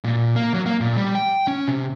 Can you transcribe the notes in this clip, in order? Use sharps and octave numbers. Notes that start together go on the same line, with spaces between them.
A#2
A#3
F#3
A#3
A#2
G3
G5
C#4
C3